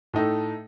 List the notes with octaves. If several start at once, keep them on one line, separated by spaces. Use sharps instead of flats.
A2 A3 D#4 A4